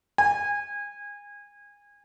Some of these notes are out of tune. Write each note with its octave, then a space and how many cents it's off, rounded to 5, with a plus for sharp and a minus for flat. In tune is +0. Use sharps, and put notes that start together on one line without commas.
G#5 -25